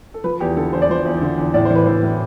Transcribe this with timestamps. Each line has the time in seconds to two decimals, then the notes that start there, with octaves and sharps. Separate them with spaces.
0.14 A4
0.24 F3 B4
0.40 E2 G4
0.57 D3 A4
0.73 E2 C5
0.82 D5
0.89 F3 C5
1.05 E2
1.21 D3
1.38 E2
1.54 A2 D5
1.65 C5
1.71 E3 B4
1.86 E3 C5
2.03 A2